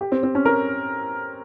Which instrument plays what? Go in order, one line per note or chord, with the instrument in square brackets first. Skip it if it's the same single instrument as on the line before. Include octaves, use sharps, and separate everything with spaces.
[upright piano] G4
C4
C4
C#4
A#4